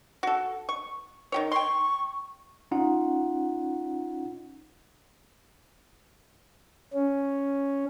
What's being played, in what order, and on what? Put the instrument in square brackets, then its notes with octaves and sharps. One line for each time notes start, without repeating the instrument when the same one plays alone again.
[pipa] F#4 A4
C#6
D#3 G4 C#5
[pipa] G5 C6 [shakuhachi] C#6
[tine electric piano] C#4 D#4 F4 F#5
[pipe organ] C#4